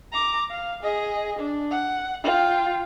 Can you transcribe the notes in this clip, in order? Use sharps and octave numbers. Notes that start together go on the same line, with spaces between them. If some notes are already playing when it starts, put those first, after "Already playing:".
A#5 D6
F5
G#4 D#5
D4
F#5
F4 G5